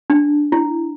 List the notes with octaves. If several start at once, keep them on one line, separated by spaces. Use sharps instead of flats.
D4
E4